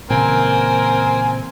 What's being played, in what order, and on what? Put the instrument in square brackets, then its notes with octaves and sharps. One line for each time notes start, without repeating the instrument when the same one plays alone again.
[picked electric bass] A#2 C#3 E3 [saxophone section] A#3 C4 [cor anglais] A#4 [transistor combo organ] G#5